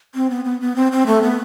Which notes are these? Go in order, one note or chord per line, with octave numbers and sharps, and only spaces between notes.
C4
B3
B3
B3
C4
C4
A3
B3